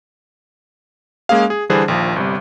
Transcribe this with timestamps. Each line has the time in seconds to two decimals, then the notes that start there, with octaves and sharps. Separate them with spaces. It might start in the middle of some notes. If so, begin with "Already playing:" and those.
1.29 G#3 A#3 C#4 G#4 F5
1.50 G#4
1.70 D3 E3 G3 D4 G#4 C5
1.88 A#1 D#2 F3
2.16 G1 C3 G3